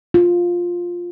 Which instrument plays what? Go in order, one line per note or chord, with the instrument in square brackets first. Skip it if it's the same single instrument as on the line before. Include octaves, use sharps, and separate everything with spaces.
[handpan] F4